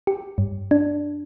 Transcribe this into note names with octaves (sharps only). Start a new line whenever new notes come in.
G4
G2
D4